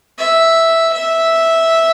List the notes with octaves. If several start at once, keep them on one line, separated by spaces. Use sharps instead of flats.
E5
E5